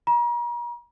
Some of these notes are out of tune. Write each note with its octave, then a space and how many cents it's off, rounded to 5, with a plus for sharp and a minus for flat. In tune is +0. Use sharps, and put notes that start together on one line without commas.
A#5 +40